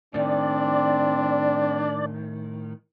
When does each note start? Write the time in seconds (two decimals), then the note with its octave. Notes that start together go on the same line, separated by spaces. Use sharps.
0.14 A2 D#3 C4 D4 D5